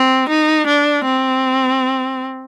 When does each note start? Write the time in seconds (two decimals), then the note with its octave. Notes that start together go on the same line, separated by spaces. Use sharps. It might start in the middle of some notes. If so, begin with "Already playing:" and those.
Already playing: C4
0.29 D#4
0.67 D4
1.05 C4